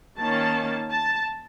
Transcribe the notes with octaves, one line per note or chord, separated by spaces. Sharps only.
D#3 A#3 C#4 A5
A5